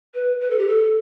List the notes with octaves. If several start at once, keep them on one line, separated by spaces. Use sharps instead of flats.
B4
B4
A4
G4
A4